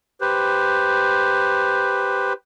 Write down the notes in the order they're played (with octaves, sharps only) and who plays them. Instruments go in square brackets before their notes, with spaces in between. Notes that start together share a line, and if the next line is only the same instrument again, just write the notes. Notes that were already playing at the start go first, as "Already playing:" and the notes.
[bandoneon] G4 B4 C5